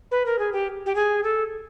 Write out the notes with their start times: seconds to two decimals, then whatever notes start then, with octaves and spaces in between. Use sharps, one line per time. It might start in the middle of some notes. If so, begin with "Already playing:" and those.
0.11 B4
0.26 A#4
0.39 G#4
0.53 G4
0.86 G4
0.95 G#4
1.23 A4